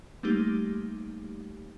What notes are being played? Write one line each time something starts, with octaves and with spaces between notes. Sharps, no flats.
G3 A3 A#3 D#4 G4